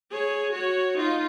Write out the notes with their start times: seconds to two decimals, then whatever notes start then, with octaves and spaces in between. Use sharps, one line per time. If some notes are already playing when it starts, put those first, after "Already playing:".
0.11 G#4 C#5
0.52 F#4 C#5
0.97 D#4 F4